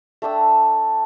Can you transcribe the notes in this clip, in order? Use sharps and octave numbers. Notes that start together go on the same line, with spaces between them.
A3 D4 G5 E6